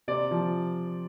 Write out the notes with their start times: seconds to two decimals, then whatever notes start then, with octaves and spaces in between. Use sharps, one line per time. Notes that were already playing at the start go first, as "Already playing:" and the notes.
0.08 C3 D5
0.31 F3